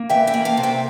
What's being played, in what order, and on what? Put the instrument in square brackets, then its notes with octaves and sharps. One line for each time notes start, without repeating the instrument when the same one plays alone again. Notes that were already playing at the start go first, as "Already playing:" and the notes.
Already playing: [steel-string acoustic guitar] A#3
E3 E5 G5
E5 G5
A#3
F5 A5
C3
E5 G5